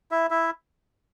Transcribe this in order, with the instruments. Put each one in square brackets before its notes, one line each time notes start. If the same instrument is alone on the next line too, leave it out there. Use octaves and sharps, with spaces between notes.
[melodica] E4 E5
E4 E5